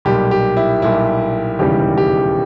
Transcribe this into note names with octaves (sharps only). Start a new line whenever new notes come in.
B1 A#2 G3 G4
G4
E4
B1 A#2 G3 E4
E1 D#2 C#3 E3 G3 G4
G4